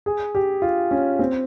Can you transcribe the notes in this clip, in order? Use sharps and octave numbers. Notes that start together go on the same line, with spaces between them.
G#4
G4
F4
C#4
C4